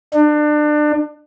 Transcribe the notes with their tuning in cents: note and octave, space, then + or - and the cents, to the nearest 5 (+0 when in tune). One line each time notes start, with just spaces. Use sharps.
D4 +30